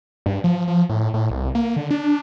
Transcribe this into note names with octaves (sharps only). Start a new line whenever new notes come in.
G2
F3
F3
A2
A2
C2
A#3
D3
D4